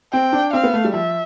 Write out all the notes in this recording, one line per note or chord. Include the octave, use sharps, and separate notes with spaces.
C4 G5
D4
C4 F5
B3
A3
G3
F3 E5